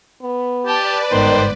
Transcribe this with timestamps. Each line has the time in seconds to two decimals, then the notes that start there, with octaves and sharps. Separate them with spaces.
0.22 B3
0.66 G4 B4 D5 A5
1.11 G1 G#2 D#3 B3 C5